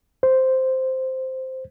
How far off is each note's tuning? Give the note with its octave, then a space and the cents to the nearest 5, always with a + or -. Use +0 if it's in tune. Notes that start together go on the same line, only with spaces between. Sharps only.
C5 -5